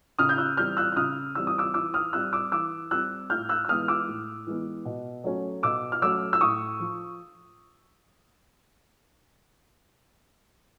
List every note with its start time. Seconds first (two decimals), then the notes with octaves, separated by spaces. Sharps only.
0.19 C#3 D#6 F6
0.29 G6
0.38 E6 F#6
0.57 E3 G3 C4 F6 G6
0.77 E6 F#6
0.92 F#6
0.96 C#3 D#6 F6
1.35 E3 G3 C4 E6
1.47 D#6
1.58 D6 E6
1.74 E3 D6 E6
1.94 D#6 F6
2.13 G3 C4 E6 F#6
2.33 D6 E6
2.52 E3 D6 E6
2.91 G3 C4 E6 F#6
3.30 A2 F6 G6
3.49 E6 F#6
3.65 E6
3.69 E3 G#3 B3 D#6 F6
3.88 D6 E6
4.08 A2
4.47 E3 G#3 B3
4.85 B2
5.24 F#3 A3 C#4
5.63 B2 D6 E6
5.92 F6
6.02 F#3 A3 C#4 D6 E6
6.33 E6
6.41 A2 C#6 D#6
6.80 F3